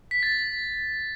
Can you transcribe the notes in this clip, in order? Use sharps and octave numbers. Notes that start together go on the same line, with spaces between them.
B6
A6